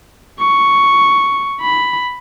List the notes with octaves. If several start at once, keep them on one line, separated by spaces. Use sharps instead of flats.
C#6
B5